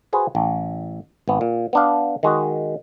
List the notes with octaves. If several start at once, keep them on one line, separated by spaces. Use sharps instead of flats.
F#4 G#4 B4 C5
A1
G#1 B3
A#2
B3 D4 F5
D#3 G#3 F#4 D#5